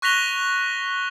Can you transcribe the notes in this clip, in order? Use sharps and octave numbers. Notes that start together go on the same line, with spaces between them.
C#6 F#6 A#6 B6 F7 G7